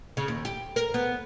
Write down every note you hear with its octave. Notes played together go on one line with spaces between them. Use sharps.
C#3
D#2
G4
A#4
B3